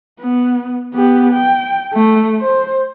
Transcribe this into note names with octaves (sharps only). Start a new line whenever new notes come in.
B3
B3 G4
G5
A3
C5